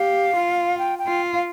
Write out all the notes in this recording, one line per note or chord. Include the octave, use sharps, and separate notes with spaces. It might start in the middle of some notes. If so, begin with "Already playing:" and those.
Already playing: G4 F5
F4
G5
G5
F4
F5